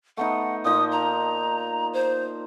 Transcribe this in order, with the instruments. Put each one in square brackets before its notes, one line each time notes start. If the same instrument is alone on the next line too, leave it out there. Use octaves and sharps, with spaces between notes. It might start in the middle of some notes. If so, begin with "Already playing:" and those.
[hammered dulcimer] A3 B3 D#4 [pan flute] F#5
[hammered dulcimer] A#2 F3 D#4 [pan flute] D#6
[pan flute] A#5
C5